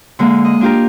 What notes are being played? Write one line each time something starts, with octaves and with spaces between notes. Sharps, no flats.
D3 G#3 A#3
D#5
D4 F4 G4 A#4